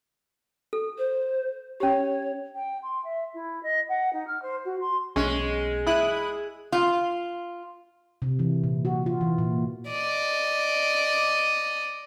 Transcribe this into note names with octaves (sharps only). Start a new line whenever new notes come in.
A4
C5
C#4 G4 C#5
G5
C6
E5
E4
D#5
F#5
D#4
F6
C5
F#4
C6
B1 G#3 C#4
E4 D#6 F#6
F4
C3
E3
A#2
F#4
F4
E3
A#2
D5 D#5